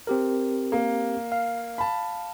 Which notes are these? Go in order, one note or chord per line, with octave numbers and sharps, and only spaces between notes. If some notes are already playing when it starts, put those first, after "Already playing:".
C4 G4 A#4
A#3
F5
A5 B5